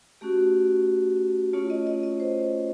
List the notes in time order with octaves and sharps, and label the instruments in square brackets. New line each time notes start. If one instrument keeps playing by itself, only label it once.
[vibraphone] A3 C#4 F#4 G4
A3 C#4 F4 C#5
D#5
D#5
D#5
C5